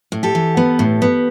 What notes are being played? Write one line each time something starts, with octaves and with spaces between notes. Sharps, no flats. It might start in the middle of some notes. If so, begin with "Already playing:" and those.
A2
G4 A4
E3
B3
A2
B3